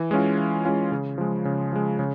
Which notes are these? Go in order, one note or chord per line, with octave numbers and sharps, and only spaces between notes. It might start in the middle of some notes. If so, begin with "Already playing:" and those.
Already playing: E3
G#3 C#4 F4
E3
G#3 C#4 F4
C#3
F3 G#3
C#3
F3 G#3
C#3